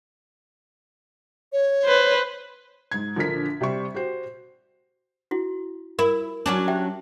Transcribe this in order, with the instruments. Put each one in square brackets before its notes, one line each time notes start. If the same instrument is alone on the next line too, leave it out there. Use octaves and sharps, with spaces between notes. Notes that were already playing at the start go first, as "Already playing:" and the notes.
[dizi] C#5
[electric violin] B4 C5
[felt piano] G#2 G#6
A#1 D3 F3 A#4 B6
C3 G3 C5 C#6
F#4 G4 C5
[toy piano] E4 F#4
[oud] E4 [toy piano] A#4
[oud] F#3 C#4 D4
[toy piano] G4 E5 G5